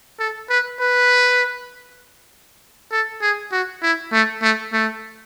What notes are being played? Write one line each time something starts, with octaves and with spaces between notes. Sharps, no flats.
A4
B4
B4
A4
G#4
F#4
E4
A3
A3
A3